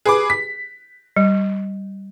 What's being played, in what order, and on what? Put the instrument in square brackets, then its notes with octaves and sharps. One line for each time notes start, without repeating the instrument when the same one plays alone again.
[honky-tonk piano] G#4 B4 D6
B6
[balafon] G3